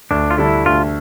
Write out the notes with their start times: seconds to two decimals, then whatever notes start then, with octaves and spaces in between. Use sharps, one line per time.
0.11 D2 D4
0.31 F4
0.38 D3 G3 D4 E4 A4
0.66 D2 F4